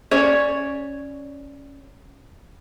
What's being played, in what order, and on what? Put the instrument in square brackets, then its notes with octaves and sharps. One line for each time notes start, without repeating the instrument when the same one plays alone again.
[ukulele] C#4 C#5 D5